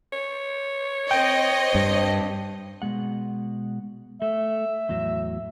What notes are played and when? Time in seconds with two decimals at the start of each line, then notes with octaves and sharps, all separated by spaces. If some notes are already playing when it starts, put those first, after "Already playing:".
0.13 C#5
1.11 C4 D#5 G5
1.75 G2
2.82 B2 G#3 F#5
4.22 A3 E5
4.89 E2 A2 F#3